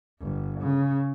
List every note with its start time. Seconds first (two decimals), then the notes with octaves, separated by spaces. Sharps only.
0.21 G1
0.60 C#3